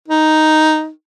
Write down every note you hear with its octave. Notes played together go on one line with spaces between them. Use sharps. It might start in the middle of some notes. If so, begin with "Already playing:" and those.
D#4